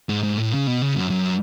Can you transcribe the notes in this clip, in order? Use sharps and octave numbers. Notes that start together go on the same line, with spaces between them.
G#2
G#2
A2
C#3
B2
C#3
F#2
F#2